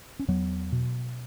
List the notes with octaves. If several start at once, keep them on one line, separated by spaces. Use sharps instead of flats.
C#4
E2 F#3 B3
B2